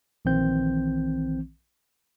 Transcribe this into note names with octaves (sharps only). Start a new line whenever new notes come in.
A#1 D#3 E3 C4 G6